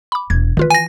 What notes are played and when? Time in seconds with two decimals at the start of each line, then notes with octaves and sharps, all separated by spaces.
0.12 B5 D6
0.30 E1 G#6
0.57 D#3 E3 F4 B4
0.70 G#5 A#6